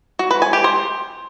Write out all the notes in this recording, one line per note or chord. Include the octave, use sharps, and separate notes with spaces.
F#4
B4
G#5
G4
C5